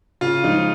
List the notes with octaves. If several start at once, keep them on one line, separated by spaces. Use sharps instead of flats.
C#3 F4
F3 G#3 D#4